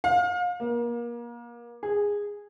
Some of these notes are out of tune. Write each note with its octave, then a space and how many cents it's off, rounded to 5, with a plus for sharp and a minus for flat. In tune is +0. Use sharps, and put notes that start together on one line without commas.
F5 +35
A#3 +30
G#4 -15